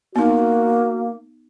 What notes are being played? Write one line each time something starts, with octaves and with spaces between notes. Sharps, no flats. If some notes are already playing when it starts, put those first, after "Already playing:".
A#3 B3 D#4 F#4